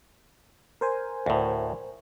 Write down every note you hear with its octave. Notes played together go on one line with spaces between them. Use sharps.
A#4 C5 G#5
D2 A2